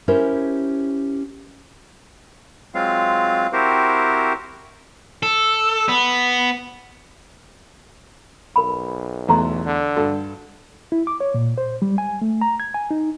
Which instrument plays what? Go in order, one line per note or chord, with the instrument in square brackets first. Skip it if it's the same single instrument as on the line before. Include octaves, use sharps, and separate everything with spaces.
[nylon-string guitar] C#4 E4 G4 A#4 C5
[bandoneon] F#3 G#3 C4 F4 F5
C4 E4 F#4 G4 A#4 C5
[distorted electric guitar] A4
B3
[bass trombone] B1 [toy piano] A#4 B5
[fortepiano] E2 A3 [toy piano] C5 A#5 C6
[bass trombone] D3
[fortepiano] G2 A4 [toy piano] F#4
[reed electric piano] E4
D6
C#5
A#2
C5
G3
G#5
A3
A#5
G#6
G#5
D#4